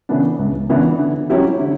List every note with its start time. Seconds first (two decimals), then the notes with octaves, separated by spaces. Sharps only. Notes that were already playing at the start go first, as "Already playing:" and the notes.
0.09 C#3 E3 B3 D4
0.39 C#2
0.69 C#3 E3 B3 D4
0.99 D3
1.30 F#3 C#4 E4 G4
1.60 D3